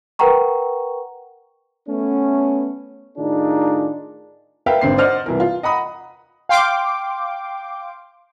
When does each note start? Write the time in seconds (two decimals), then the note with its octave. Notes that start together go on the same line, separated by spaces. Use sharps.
0.19 A#4 B4 F#5 G5 A#5 C#6
1.88 A3 B3 C#4
3.18 A2 D#3 D4 D#4 F4 G#4
4.66 A#4 B4 E5 F5 G5
4.81 G#1 D3 C4 C7
4.98 C5 D5 D#5 F#5 F6
5.26 C2 E3 A#4
5.40 F4
5.63 D#5 F#5 A#5 B5 D#6
6.49 F5 G5 C6 D6